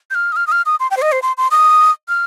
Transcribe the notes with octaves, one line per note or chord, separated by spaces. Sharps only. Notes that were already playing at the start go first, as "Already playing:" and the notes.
G6
F6
D#6
F6
D#6
F6
D#6
C6
G5
C5
D#5
C5
C6
C6
D#6
F6